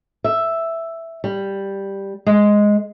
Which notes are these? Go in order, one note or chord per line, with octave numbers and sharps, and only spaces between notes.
E5
G3
G#3